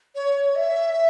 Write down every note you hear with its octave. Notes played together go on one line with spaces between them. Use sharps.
C#5
E5